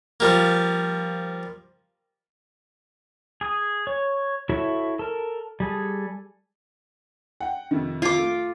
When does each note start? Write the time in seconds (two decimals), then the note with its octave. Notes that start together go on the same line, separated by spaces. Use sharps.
0.20 F3 G3 A#3
3.41 G#4 D#6
3.87 C#5
4.49 E4 F#4 A4 C#5 E5
4.99 A4 A#4
5.60 G3 G#4 A4
7.40 F#5 G5
7.71 F2 C3 D#3
8.02 F4 D6
8.18 A3